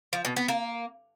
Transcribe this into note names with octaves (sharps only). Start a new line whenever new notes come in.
F3
B2
B3
A#3